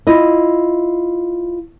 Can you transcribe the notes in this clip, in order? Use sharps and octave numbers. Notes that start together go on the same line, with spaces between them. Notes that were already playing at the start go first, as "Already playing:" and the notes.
E4 F4 D#5